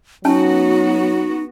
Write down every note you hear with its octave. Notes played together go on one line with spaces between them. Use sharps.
F#3 B3 C#4 D#4 F#4 G#5 A5